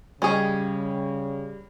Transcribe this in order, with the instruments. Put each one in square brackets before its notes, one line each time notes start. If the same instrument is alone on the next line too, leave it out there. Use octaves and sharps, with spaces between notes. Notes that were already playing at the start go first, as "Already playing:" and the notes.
[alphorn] C#3 [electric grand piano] G3 [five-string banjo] C#4 G#4 [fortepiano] G4 C#5 D#5